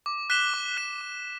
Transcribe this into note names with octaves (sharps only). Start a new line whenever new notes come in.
D6
F#6 B6 E7 G7
D6
F#6 B6 E7 G7
D6